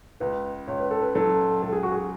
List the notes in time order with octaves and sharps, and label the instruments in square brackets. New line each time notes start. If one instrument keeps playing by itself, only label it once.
[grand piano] C#2 [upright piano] B4
[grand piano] C#2 [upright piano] C#5
[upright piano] B4
A4
B4
[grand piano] F#3 [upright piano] A4
[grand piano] C#2 [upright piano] A4
[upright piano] G#4
F#4
G#4